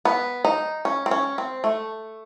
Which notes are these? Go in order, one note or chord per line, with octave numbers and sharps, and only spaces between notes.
B3
D#4
C#4
C4
C#4
C4
A3